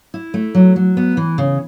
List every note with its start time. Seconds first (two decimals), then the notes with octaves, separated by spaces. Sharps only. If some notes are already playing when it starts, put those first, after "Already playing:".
0.14 E4
0.34 A3
0.55 F#3
0.76 F#3
0.97 B3
1.17 E3
1.38 C#3